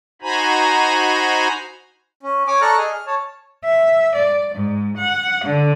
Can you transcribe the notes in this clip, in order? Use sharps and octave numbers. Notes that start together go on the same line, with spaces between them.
D#4 F#4 C5 G#5 A#5 B5
C#4
C#5 G#5 D6
A4 D5 A#5 C#6 F6 F#6
G#4 D#5 G#5
F6
C#5 A5
E5
D5
G#2
F#5
D3